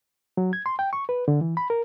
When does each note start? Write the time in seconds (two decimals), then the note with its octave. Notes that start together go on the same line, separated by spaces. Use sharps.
0.37 F#3
0.53 G#6
0.66 C6
0.79 G5
0.93 C#6
1.09 B4
1.28 D3
1.41 E3
1.57 B5
1.70 A#4